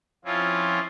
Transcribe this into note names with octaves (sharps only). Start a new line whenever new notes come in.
F3 C4 C#4 E4 F4